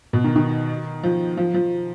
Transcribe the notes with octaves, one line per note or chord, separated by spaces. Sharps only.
B2
D#3
D#3
F3
F3
F3